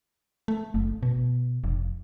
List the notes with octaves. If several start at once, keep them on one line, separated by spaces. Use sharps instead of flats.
A3
F#1
B2
F1